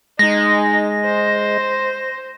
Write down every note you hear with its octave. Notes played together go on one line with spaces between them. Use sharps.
G#3 D#4 A#6
C5